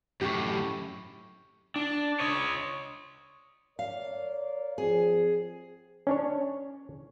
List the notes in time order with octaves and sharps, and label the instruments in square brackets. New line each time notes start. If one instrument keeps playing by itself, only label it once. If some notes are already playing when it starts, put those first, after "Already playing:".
[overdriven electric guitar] F#2 A2 [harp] G4 G5 C#6
[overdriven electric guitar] D4
C#5 D#5
[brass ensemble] A#4 C#5 D5 [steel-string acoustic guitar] F5
[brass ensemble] F3 C4 [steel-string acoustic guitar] G#4
[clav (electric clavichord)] C#4 D4 C#5